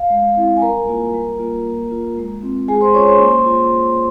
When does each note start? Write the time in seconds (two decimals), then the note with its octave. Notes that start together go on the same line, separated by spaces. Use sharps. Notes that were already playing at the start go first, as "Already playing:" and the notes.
Already playing: F5
0.10 G#3
0.36 C4 E4
0.57 G#5
0.62 G3 A#4 A#5
0.87 A#3 F4
1.14 G3
1.39 A#3 F4
1.65 A#3
1.91 F4
2.17 G#3
2.43 C4 F4
2.68 G#3 G#4 G#5
2.81 C5 C6
2.94 C#4 F4 C#5 C#6
3.07 C5 C6
3.20 A#3
3.46 F4